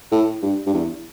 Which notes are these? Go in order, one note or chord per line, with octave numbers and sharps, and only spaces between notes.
A2
G2
G2
E2